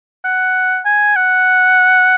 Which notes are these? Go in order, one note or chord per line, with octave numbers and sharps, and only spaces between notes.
F#5
G#5
F#5